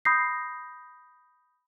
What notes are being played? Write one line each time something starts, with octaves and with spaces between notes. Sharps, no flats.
B5 D#6 G6 A#6 C7